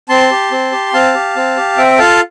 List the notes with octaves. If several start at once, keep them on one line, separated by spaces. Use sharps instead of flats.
C4 A5 C6
G4
C4
G4
C4 F5 A5
G4
C4
G4
C4 E5 G5
F4 A4 F5 A5